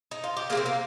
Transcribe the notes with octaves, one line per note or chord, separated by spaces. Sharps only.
D#4
F4
G4
G3 A#3 G#4
C3 C4
A#3